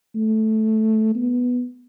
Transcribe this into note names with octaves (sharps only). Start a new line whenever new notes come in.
A3
B3